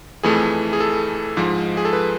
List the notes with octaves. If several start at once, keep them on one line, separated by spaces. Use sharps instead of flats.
F2 E3 A3 G#4
G#4
A4
G#2 F3 G#3
G#4
A4
B4